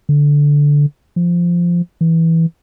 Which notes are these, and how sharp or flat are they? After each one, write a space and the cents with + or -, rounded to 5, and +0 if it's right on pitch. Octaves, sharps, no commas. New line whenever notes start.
D3 -10
F3 -10
E3 -10